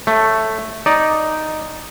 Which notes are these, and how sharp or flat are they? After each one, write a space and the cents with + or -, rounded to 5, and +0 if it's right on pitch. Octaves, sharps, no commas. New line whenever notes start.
A3 +0 C#5 +0
D#4 +0 D5 +0